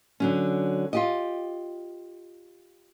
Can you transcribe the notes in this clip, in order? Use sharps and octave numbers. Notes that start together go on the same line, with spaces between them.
D3 F#3 C#4
F4 G4 D#5